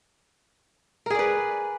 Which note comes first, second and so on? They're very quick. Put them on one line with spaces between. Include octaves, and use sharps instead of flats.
A#4 G#4 D5 B4